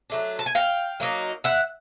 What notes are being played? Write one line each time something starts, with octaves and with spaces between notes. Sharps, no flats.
F#3 A3 D4
A5
G#5
F5 G5
F#3 A#3 D#4
E5 F#5